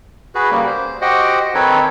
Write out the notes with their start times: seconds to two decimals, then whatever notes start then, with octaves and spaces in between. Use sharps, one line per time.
0.35 F#4 G#4 B4
0.50 C#3 G3 A#3
0.67 C5
1.01 F#4 G4 C5 D#5 F#5 G5
1.55 D#3 C4 D#4 A4 B4 C#5